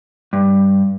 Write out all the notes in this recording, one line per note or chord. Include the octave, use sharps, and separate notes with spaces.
G2